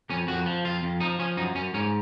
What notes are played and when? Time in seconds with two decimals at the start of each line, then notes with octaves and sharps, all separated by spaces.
0.10 F2 C#4
0.28 F2 F#4
0.46 F3
0.64 F2 F4
0.83 F2
1.00 F3 D#4
1.19 F3 C#4
1.37 F#2 D#4
1.55 F#2 C#4
1.74 G#2 C#4